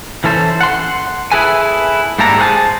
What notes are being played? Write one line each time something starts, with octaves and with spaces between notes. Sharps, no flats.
E3 C#4 A4 C5
F#5 C6
E4 G#4 A4 B4 G#5
G#2 G3 A#3 D4 A4 A#5
G#4 C5 C#5 F#5 G#5 A5